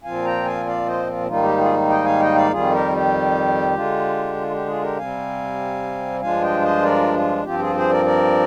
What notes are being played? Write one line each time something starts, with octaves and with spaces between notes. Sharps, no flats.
A#2 F3 C4 F4 F5 G#5
G5 A#5
F5 G#5
D5 F5
C5 D#5
F4
G#2 D#3 G3 A#3 D#4 F4
G4
F4 G#4
D#5 G5
F5 G#5
D#5 G5
D5 F5
F2 D#3 G3 F4 G#4
G4 A#4
G4
D3 G#3 D4 F4
F4
G4
F4 G#4
G4 A#4
C3 G3 C4 F5 G#5
G2 F3 G#3 D4 F4 F5 G#5
D#5 G5
C5 D#5
A#4 D5
F4
G2 F3 C4 F4 G4
F4 G#4
G#4 C5
A#4 D5
A#4 D5